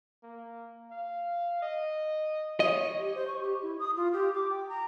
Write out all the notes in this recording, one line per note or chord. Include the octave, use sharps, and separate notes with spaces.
A#3
F5
D#5
C#5 D#5
G4
C5
C#6
G4
E4
D#6
F4
G4
D6
G5
A#5